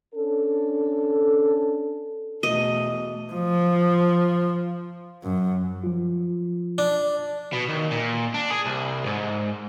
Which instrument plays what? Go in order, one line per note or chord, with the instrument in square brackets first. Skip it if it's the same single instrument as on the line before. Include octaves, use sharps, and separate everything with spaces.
[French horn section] C#4 D4 A4
[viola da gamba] E2 A3 [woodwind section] B2 [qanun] D#5
[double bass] F3
F#2
[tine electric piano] F3 F4
[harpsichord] D4
[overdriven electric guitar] B2
D#2
A#2
D4
G#4
C2
G#2